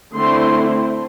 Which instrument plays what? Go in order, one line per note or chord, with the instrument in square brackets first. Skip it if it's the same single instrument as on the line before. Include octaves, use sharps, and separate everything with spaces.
[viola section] D3 A3 C4 E4 C6